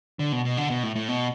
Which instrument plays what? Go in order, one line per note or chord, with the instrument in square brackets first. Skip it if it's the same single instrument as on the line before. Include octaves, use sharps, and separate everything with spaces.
[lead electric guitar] D3
B2
B2
D3
B2
A2
A2
B2